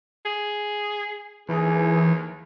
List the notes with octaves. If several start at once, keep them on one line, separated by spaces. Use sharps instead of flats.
G#4
D#2 E3 G#4